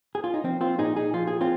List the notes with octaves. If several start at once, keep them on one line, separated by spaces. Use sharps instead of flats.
G#4
F4
D#4
F3 C4
C4 F4
A#2 D#4 G#4
D#4 G#4
F3 F4
G#4
C4 F4